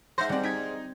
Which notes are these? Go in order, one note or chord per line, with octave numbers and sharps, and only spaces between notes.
G#2 C5 E5 F#5 C6 G6 A#6
G3 C4 D5 F#5
D#4 G#6 B6 D7